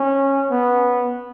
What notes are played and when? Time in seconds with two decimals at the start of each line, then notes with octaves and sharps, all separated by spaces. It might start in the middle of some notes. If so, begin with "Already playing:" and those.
Already playing: C#4
0.50 B3